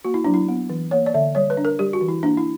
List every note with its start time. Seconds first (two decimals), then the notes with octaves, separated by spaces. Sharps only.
0.04 A#3 F#4
0.14 E4
0.24 F#3 D4
0.34 E4
0.48 B3
0.70 E3
0.91 A#3 C#5
1.06 D5
1.14 D3 E5
1.35 G3 C#5
1.50 B4
1.57 D4
1.65 A#4
1.79 G3 G4
1.93 F#4
2.01 E3
2.08 E4
2.23 A#3 D4
2.38 E4